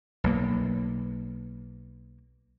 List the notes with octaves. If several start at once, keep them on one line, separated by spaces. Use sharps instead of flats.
B1 A#3